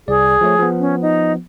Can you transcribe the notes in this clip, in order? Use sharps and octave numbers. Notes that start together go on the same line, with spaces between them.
C2 G#4 D5
F3 A3 C#5
F3 B3
C#4
D#4